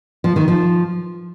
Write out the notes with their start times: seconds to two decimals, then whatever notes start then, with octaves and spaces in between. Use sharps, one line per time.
0.24 F3
0.36 D#3
0.48 F3